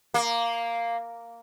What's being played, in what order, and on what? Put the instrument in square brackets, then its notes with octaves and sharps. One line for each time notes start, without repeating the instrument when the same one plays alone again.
[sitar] A#3